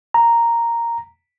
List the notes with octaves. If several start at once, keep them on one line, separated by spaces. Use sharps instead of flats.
A#5